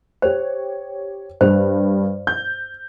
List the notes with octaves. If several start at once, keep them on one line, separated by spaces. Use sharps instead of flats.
G4 C5 C#5
G2 C5
G6